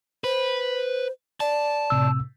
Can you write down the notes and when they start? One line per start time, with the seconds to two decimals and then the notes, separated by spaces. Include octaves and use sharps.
0.24 B4 C5
1.40 D5 A5
1.90 A2 C3 E6